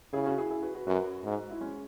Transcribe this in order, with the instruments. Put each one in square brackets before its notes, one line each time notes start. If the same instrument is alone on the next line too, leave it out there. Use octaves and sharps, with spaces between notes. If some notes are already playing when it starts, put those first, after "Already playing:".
[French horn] C#3 [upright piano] E4 G#4
[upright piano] C#4 F#4
E4 G#4
E4 G#4
F#4 B4
F#4 B4
[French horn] F#2 [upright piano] F#4 B4
[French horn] G#2
[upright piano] E4
G#3 C#4